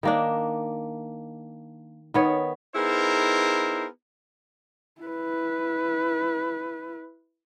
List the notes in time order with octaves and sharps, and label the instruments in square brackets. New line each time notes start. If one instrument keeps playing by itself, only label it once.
[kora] D#3 A#3 D4
D#3 B3 C#5
[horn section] B3 D#4 E4 G#4 A#4 C5
[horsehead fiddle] E4 B4